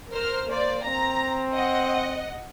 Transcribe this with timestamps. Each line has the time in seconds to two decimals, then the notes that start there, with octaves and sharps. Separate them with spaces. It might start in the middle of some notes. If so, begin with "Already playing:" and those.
0.13 A#4 C5 F6
0.50 A#3 C5 D5
0.85 C4 A#5
1.54 D#5 F#5